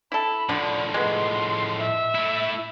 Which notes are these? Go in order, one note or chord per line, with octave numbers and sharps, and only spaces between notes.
E4 A4 B5
A2 D3 F3
G#3 B3 C6
E5
A3 E4